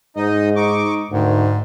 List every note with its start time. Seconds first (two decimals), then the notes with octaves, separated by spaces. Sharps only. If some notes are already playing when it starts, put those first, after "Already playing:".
0.16 G#2 D#4 D#5
0.56 D#4 C#6 D6
1.11 D2 G#2 D#3